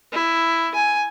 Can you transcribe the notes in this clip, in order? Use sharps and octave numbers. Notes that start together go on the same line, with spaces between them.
E4
G#5